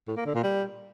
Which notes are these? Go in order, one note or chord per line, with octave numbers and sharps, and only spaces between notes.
A2
A#3
D3
A#2
G3